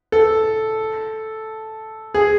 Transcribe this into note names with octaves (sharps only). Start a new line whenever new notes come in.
A4
G#4